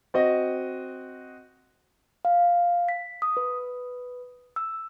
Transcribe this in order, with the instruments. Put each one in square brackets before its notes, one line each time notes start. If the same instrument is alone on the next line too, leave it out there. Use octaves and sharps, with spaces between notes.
[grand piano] C4 F#4 D#5
[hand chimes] F5
B6
D#6
B4
E6